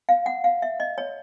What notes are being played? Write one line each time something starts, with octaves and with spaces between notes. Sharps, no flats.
F5
F#5
F5
E5
D#5
C#5